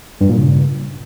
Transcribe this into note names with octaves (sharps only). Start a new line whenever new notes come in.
G2
A#2
C#3